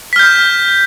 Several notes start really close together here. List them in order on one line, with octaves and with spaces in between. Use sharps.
B6 F6 G6